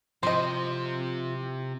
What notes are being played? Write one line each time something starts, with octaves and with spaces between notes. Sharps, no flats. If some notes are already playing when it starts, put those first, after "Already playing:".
C3 F3 C5 D#5